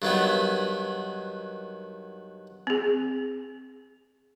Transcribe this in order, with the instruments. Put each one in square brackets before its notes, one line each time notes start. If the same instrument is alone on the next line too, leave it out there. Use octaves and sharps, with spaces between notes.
[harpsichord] G2 D#3 F#3 B3
[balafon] C4 G#4